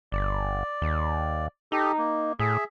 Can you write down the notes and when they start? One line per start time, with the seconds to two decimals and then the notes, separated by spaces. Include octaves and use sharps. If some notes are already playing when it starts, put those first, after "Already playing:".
0.12 G1 D5
0.82 D#2
1.72 D#4 G4 A4
1.98 A#3
2.39 A2 G#4 E5